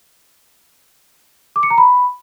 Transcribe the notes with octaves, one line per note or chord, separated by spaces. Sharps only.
D6
C#7
A#5
B5